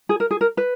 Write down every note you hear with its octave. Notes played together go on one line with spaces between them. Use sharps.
G#4
A#4
G#4
A#4
B4